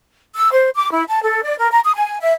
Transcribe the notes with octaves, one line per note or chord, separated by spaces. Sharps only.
E6
C5
D6
E4
A5
A4
D5
A#4
A#5
D#6
G#5
E5